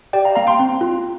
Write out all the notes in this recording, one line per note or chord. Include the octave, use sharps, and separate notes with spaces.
G4 D5 G5
F5 A#5
A#3 F5 A#5
G5 C6
C4
F4